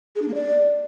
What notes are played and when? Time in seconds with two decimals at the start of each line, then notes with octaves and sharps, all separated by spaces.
0.16 G#4
0.22 D4
0.28 A#3
0.34 D5